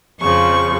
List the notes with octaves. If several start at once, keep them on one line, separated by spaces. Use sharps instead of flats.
F2 C#3 F3 C#6